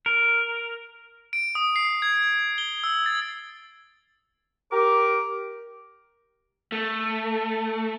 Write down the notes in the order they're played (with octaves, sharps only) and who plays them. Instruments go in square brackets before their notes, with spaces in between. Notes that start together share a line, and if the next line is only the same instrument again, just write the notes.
[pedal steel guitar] A#4
[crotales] D7
D#6
C7
G#6
G7
E6
A6
[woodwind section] G4 A#4 D6
[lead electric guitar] A3